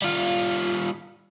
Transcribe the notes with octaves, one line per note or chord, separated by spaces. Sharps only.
G3 F4